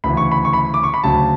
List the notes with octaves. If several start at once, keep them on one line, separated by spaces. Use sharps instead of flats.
D2 C#3 E3 B5
C#6
B5
C#6
B5
D6
C#6
B5
D2 C#3 F#3 A5